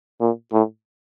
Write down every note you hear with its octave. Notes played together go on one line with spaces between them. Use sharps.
A#2
A2